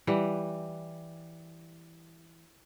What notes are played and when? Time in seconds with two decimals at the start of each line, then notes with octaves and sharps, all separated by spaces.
0.07 E3 G3 F#5